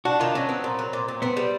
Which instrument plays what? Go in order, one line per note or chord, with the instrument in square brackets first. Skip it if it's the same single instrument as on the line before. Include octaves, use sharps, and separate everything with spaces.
[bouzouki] D4 [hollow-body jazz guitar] F#4
[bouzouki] D#3 [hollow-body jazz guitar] F4
[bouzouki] F#3 [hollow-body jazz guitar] C#4
[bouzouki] B3 [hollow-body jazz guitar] C4
[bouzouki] A#2
F#3
A#2
A#2
[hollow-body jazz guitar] B3 [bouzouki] C4
[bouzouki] G3